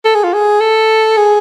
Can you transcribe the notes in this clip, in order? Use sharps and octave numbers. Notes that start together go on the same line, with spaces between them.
A4
G#4
F4
G#4
A4
G#4